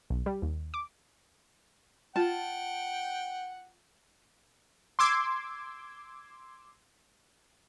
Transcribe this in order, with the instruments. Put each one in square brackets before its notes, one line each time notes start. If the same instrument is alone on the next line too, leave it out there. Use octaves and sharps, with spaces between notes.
[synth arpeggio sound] B1
G3
D#2
D6
[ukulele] F4 A5 [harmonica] F#5 G5
[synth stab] C6 D6 E6 G#6